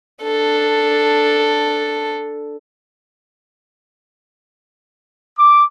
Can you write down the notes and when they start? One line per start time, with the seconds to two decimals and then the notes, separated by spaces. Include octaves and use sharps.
0.23 D4 A4
5.37 D6